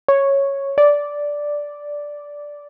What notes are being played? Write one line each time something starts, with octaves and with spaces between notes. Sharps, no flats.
C#5
D5